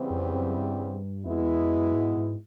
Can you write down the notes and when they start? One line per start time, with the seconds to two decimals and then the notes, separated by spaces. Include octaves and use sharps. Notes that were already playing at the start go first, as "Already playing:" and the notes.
Already playing: E2 C#3 E3 G3 C4
0.11 F2
0.34 F#2
0.57 G2
1.25 F2 B2 G#3 B3 E4
1.42 E2
1.60 F2
1.77 F#2
1.94 G#2
2.17 G#2